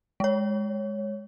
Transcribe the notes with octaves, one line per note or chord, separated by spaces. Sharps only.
G#3 C#5